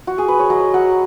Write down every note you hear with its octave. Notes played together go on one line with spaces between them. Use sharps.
F#4
G#4
B4
C#5
F#3 D#5
F#3 F#5